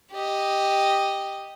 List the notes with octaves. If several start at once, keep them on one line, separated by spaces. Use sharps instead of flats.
G4 D#5